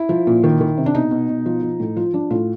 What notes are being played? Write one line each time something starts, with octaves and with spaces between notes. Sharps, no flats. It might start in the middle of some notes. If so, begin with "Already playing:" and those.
Already playing: E4
F3
A#2
D#3
D#3
C3
D4
B2 D#4
B2
B2
F3
F3
A2
F3 F4
F3 D4
A2 F4